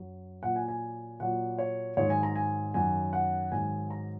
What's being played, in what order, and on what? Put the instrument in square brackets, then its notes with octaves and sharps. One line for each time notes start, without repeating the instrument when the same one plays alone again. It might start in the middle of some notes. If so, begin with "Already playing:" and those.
Already playing: [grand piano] F#2 F#3
A#2 F#3 F#5
G#5
G#5
A#2 F#3 F#5
C#5
G#2 D#3 F#3 C#5
G#5
A#5
G#5
F#2 D#3 F#3 G#5
F#5
G#2 D#3 F#3 G#5
A#5